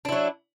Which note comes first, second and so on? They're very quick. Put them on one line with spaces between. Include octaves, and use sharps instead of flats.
D4 E4 F#3